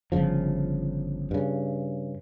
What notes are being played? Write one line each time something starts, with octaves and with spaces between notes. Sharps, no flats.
G1 C#3 F3
G2 C#3